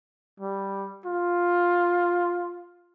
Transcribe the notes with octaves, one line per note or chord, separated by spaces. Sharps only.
G3
F4